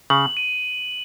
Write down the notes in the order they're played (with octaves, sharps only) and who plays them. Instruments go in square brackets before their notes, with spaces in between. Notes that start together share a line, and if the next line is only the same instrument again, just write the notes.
[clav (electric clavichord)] C#3 [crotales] F#7
[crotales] D#7